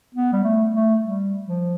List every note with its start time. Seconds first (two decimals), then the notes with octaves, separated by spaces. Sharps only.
0.15 B3
0.33 G3
0.44 A3
0.74 A3
1.03 G3
1.47 F3